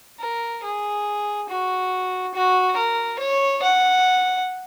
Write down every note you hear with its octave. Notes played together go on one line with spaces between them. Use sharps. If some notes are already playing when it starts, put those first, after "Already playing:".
A#4
G#4
F#4
F#4
A#4
C#5
F#5